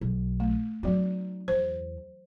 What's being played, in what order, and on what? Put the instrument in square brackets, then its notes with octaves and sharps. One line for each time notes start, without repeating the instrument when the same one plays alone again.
[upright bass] B1
[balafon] A3
[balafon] F#3 F#4 [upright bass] C4 D#4
[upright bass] E2 [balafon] C5